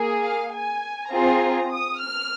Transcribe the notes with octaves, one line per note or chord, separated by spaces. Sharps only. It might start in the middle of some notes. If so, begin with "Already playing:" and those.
Already playing: A#3 G#4
F5
G#5
C4 F4 G#4 A#5
D#6
F6